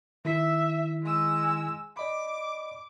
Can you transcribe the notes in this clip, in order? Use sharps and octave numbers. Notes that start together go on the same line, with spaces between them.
D#3 E4 E5 B6
G#3 E6
D5 D#5 B5 D6